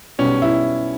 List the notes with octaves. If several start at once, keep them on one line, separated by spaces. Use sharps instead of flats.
B1 B2 G3 B3 C#4
E4